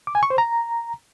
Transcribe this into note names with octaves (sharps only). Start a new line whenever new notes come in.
D6
G#5
C#6
C5
A#5